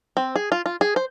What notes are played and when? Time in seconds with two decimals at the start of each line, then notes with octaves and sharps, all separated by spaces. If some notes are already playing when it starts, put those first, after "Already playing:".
0.17 C4
0.36 G#4
0.52 F4
0.66 F4
0.81 G#4
0.96 C5